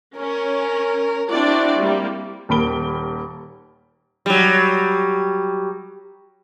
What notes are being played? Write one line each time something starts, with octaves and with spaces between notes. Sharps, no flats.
C#4 A#4
C4 D4 E4 F#4 D5
G3 A#3
D#1 D#2 A#4 B5 D7 G7
F#3 G3